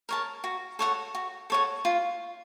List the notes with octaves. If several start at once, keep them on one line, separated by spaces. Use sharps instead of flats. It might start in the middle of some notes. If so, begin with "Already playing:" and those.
A#4 C#5 A5
F#4
A4 C#5 F#5
F#4
A4 C#5 F#5
F4